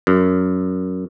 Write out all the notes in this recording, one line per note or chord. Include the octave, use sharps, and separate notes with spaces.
F#2